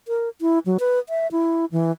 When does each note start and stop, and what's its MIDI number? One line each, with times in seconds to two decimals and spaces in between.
0.08 0.29 70
0.41 0.59 64
0.66 0.78 54
0.80 0.99 71
1.09 1.27 76
1.32 1.65 64
1.72 1.92 52